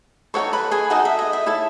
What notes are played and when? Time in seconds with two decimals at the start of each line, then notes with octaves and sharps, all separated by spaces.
0.34 D#4 F#4 A4 C#5 C#6
0.53 B4 B5
0.71 G#4 G#5
0.90 D#4 F#4 A4 D#5 F#5
1.05 E5
1.19 D#5
1.33 E5
1.46 E4 A4 C#5